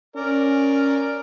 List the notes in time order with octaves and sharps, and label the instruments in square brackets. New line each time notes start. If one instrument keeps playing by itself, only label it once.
[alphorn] C#4 [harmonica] A#4 D5